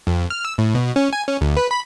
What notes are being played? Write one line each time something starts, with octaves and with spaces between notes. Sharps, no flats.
F2
F6
E6
A2
B2
C#4
G#5
C#4
D2
B4
B5